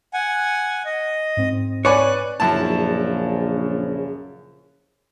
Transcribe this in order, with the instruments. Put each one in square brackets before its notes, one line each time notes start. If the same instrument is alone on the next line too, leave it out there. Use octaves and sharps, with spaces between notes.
[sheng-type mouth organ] F#5 G#5
D#5
[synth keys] G#2 C4
[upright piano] B4 D5 G#5 [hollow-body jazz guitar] C#5 [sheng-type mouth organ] F#6
[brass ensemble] A#1 C#3 [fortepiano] F#2 E4 A5